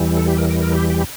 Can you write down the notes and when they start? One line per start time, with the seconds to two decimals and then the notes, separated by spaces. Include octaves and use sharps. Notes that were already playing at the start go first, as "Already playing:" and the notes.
Already playing: E2 E3 G3
0.17 A4
0.27 G4
0.38 A#4
0.49 A#4
0.60 A#4
0.75 G4
0.90 G4